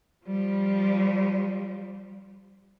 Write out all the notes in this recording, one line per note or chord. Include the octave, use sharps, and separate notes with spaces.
F3 G3